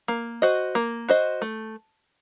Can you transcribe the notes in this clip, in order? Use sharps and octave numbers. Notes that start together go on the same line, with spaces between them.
A#3
F#4 C5 D#5
A#3
F#4 C5 D#5
A3